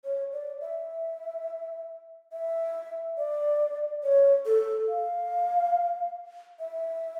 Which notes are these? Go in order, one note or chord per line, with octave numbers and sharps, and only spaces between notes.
C#5
D5
E5
E5
D5
C#5
A4
F5
E5